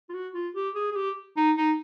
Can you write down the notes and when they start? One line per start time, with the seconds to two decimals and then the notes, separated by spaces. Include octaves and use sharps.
0.09 F4
0.14 F#4
0.34 F4
0.55 G4
0.75 G#4
0.91 G#4
0.96 G4
1.37 D#4
1.57 D#4